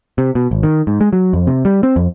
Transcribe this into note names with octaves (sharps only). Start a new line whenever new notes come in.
C3
B2
G#1
D#3
G#2
G#3
F#3
F2
C3
G3
C4
F2